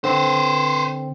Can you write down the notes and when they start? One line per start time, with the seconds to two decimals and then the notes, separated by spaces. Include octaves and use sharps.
0.04 D3 C4 B4 C5